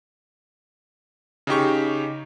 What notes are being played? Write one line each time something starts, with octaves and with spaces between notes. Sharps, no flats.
C#3 D#4 G4 C#6